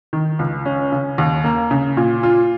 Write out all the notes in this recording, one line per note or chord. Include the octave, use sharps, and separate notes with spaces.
D#3
C#2
C#4
C#3
D#2
A#3
C#3
A#2
F4